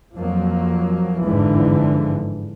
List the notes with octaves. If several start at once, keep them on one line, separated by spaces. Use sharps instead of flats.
F2 F3 F#3 A#3
G1 F2 G#2 D3 E3 F3